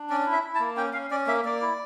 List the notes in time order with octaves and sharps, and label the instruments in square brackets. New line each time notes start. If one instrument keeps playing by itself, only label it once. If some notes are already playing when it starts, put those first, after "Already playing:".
Already playing: [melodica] D4
C#4 D5
E4
E5
E4
A5
A#3
C#4 G5
C#4 F5
C#4 D5
A#3 E5
A#3 D5
E4